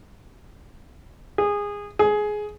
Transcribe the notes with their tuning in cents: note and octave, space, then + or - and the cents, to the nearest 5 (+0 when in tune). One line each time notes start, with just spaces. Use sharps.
G#4 -20
G#4 +15